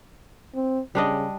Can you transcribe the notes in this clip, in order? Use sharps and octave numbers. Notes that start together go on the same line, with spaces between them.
C4
C#3 G3 D4 D#5